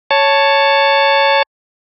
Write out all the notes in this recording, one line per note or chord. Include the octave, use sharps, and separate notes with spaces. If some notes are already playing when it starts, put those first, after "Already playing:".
C#5 A5